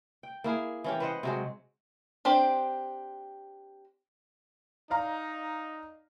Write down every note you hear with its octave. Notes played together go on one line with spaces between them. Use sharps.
G5
A#3 E4 G#4
E3 C#4 G4
B4 C5 D#5 F#5
C3 F#3 G#3
C4 D4 G4 C5
D#4 D5 F5 A#5